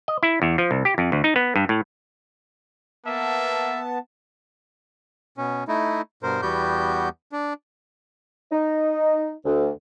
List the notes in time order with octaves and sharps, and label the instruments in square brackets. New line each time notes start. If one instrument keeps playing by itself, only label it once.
[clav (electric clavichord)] D#5
E4
E2
F3
C2
G4
F2
D2
D#4
B3
G2
A2
[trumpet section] A#3 E5 [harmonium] B3 A5
[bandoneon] B2 C#4
A3 D#4 E4
G2 B2 A#4 C5
E2 G3 B3 F#4 G4 G6
D4
[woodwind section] D#4
D2